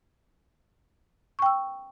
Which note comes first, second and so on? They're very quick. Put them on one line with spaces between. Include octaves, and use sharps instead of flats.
C#6 G5 E6